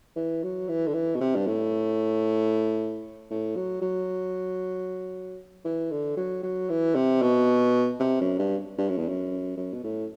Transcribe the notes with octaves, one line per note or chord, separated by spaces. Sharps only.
E3
F#3
E3
D3
E3
B2
C3
G2
A2
A2
F#3
F#3
E3
D3
F#3
F#3
E3
C3
B2
C3
F#2
G2
G2
F#2
E2
F#2
F#2
B2
A2